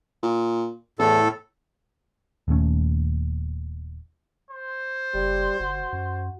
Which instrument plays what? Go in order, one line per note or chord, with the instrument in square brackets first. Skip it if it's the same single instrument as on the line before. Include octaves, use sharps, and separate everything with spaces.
[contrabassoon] A#2
[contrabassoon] E2 [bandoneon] A2 A4
[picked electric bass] D#1 D#2 A3 C#4
[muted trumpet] C5
[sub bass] F#1 [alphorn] G3
[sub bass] G1 [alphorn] F#4
[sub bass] F#2